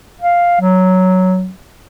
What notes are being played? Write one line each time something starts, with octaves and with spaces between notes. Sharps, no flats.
F5
F#3